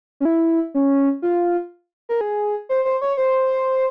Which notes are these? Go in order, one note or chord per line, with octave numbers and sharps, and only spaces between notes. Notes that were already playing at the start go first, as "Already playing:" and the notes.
C#4
E4
C#4
F4
A#4
G#4
C5
C5
C#5
C5